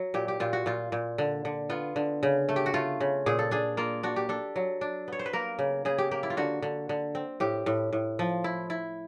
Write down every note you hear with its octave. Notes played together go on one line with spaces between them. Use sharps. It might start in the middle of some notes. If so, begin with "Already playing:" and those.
Already playing: F#3
A#2 G4
G4
A#2 F4
F#4
A#2 F4
A#2
D3
D3
B3 F4
D3
C#3
A3
G4
F#4
A3 F4
C#3
A#2 G#4
A4
D4 G#4
A#3 F4
D4 F#4
G4
D4 A4
F#3
D4
B3 C#5
C5
B4
A#3 A#4
C#3
C#3 G#4
G4
A#3 G4
E4
F4
D3 F#4
D3
D3
C4
A2 G4
A2
A2
F3
E4
E4